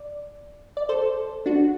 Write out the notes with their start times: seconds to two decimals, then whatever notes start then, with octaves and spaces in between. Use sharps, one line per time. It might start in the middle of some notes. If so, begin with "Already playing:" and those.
Already playing: D5
0.77 D5
0.89 A4 C5
1.46 D4 F#4